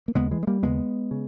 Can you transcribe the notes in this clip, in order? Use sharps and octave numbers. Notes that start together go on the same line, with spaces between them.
A#3
D#2 C#3 G#3 B3
E3 G#3
G#3
G3 A#3
D#2 C#3 G#3 B3
C#3